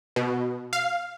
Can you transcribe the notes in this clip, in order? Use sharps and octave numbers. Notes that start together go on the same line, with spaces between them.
B2
F5